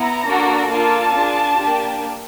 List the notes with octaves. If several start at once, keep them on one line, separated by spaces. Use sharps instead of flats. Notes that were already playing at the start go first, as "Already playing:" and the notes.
Already playing: B3 E4 A#5
A#3 D4 F#4 A4
A#3 D4 F4 A4 A5
D4 F4 G#4
A#3 D4 G4